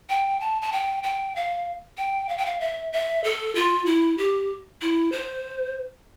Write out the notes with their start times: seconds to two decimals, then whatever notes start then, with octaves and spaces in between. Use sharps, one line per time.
0.10 G5
0.41 A5
0.62 A5
0.72 G5
1.03 G5
1.36 F5
1.97 G5
2.29 F5
2.38 G5
2.46 F5
2.60 E5
2.93 E5
3.24 A4
3.55 F4
3.86 E4
4.18 G4
4.81 E4
5.12 C5